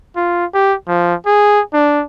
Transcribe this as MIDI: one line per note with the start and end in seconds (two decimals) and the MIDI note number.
0.16 0.46 65
0.54 0.75 67
0.87 1.14 53
1.26 1.62 68
1.73 2.04 62